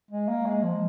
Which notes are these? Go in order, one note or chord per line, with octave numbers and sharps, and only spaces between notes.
G#3
A#3
G#3
F3